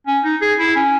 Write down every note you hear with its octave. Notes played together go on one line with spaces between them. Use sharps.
C#4
D#4
G#4
E4
C#4